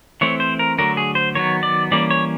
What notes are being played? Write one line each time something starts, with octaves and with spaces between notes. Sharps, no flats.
E3 A3 C4 C#5
C5
A#4
D3 F#3 A3 A#4
G#4
C5
D#3 F#3 B3 C#5
D5
E3 G3 A#3 C#4 D5
C#5